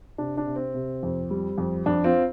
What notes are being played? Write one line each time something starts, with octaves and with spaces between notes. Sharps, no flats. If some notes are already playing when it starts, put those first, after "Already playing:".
C3 D4
D4
C3
C4
C3
F2
G3
F2
F2 D4
C4 F4